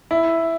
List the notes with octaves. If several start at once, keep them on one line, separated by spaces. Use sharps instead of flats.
E4